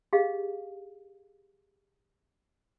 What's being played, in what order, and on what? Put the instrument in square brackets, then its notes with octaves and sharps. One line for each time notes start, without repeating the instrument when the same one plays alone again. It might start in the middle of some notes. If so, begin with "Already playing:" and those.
[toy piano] G4 G#4 D#5 F5